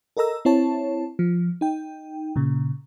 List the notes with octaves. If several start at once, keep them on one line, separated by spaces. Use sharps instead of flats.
A4 A#4 D#5 A#5 E6
C4 E4 C#5 A5
F3
D#4 G5
A#2 C#3